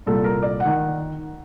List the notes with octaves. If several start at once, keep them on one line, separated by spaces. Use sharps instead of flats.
C2 A#2 A4
A#4
D5
F#5
D#3